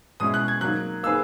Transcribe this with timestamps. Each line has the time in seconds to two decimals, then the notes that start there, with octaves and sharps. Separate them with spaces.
0.20 B2 G#3 C#4 E4 D#6
0.34 F#6
0.48 G#6
0.61 F#3 A#3 D#4 F#6
1.03 A#3 D#4 G#4 B4 E6